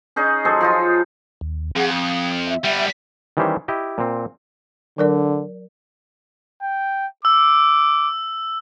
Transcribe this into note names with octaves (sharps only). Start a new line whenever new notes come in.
C#4 D#4 G#4 D#5
F#3 G#4 A4 C5
F3 D#4 F4
D#2
F2 G#4 F#5
D#6
E5
G3 B3
D#3 E3 G3 C#4 G4 C5
E4 G4 D#5
A#2 C4
D3 F#3 A#4 D5
G5
D6 E6